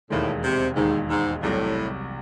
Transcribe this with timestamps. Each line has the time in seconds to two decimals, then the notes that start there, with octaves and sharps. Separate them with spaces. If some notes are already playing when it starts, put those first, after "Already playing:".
0.10 E1 D#2 A2 D#3 G#3
0.44 C3
0.76 E1 D#2 G#2 D#3 G#3
1.10 G#2
1.43 C2 A2 C3 F#3